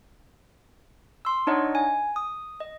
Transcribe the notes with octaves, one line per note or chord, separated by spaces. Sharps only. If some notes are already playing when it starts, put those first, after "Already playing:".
C6 E6
D4 D#4 C#5 D#5 F#5
G#5
D#6
D#5